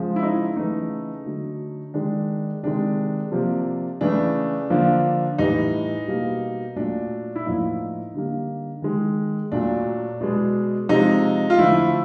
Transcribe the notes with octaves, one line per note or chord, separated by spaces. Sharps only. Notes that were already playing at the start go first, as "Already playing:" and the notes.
Already playing: C#3 F3 G#3
E4
D#4
C#3 E3 A3 D#4
D3 F#3 A3
D#3 G#3 D4
C3 D#3 G#3 D4
C3 F3 A#3
C#3 E3 A3 D4
D3 F3 A#3
A2 E3 G3 D#4
B2 G3 A#3
A#2 F#3 A3 D4
E4
A2 F3 A#3 D#4
D3 G3 A#3
D#3 G#3
A#2 F#3 A3 D4
B2 G#3
C3 F3 G#3 D#4
F4
D3 F3 A3 E4